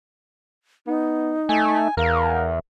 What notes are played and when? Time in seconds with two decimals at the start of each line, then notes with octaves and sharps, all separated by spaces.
0.87 B3 D#4
1.49 A3 G#5
1.97 E2 A#4 F5